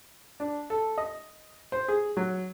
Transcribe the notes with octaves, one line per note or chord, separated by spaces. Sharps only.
D4
A4
D#5
C5
G#4
F#3